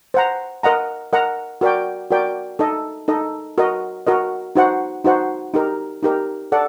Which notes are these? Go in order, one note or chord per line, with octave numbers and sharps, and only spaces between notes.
C5 F#5 A#5
A#4 D#5 F#5 A#5
A#4 D#5 F#5 A#5
F#4 A#4 D5 G5
F#4 A#4 D5 G5
D#4 A4 D#5
D#4 A4 D#5
F#4 A#4 D#5
F#4 A#4 D#5
D#4 F#4 C5 F#5
D#4 F#4 C5 F#5
D#4 G4 A#4
D#4 G4 A#4
A4 D5 F#5